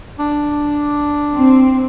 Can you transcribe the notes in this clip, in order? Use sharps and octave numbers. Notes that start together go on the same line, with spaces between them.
D4
C4